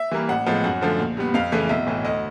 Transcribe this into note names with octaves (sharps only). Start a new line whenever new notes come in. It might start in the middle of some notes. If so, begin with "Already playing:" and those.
Already playing: E5
E3 G3 A#3
A1 F#5
A2 F3 G#3 B3
F#2 F#5
D3 F3 A3
A#1
A#2 G3 B3
F2 F5
C#3 E3 A3
B1 E5
A2 E3
D2 D#5